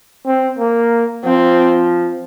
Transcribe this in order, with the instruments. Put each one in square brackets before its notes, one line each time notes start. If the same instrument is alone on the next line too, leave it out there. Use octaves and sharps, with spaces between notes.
[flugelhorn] C4
A#3
[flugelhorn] F3 [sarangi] C4